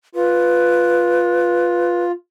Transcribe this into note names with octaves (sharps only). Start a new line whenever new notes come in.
F4 B4